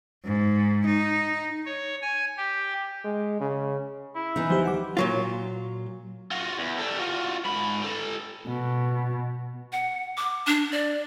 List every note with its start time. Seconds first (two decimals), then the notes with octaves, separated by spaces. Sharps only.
0.25 G#2
0.86 D#4
1.66 C#5
2.01 G#5
2.37 G4
3.04 G#3
3.40 C#3
4.15 E4
4.36 E3 B3 D#4
4.50 D2 F3 F#3 G4 C5
4.65 F#5 D6
4.97 A#2 F#3 F4
6.31 F4 F#4
6.59 E2
6.79 G3 A4
6.99 F4 F#4
7.45 G#2 B5
7.82 G4 A4
8.48 B2
9.72 F#5
10.17 D6
10.47 D4
10.72 D5